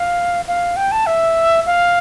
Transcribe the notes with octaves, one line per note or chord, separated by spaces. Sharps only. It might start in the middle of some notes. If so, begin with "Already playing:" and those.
Already playing: F5
F5
G5
A5
E5
F5